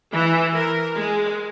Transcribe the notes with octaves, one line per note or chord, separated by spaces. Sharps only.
E3
A#4
G#3